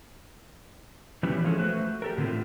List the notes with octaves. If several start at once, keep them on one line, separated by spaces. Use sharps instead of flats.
E3 F#3 G3 B3 C#4 E4
F3 G#3 A3 C#4 A4
A3 F#4 B4 C5
G4 A4 A#4
A2 D3 C4 F4